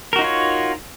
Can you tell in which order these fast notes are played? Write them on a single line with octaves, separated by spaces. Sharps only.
A#4 F#4 D#4 F4 C#5